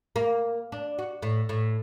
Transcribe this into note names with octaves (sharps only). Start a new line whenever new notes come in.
A#3
D4
F#4
A2
A2